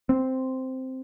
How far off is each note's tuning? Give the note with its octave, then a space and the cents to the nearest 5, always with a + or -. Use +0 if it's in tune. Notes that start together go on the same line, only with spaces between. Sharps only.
C4 -5